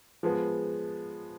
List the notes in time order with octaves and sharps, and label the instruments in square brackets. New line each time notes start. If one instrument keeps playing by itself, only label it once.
[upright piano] F3 G#3 B3